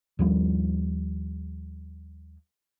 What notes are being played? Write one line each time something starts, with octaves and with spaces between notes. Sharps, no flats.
D#2 F3 G3